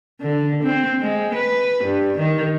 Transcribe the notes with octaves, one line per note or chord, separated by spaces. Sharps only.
D3
C4
G#3
B4
G2
D#3